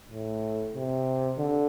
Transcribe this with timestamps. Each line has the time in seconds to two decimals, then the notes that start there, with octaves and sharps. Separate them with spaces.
0.10 A2
0.74 C3
1.38 D3